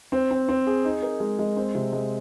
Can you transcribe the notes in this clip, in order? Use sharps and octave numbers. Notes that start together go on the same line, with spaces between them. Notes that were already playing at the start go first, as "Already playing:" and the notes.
C4
C4
C4
G#4
D#4
A#4
G#3
G#3
C4
C3
G#3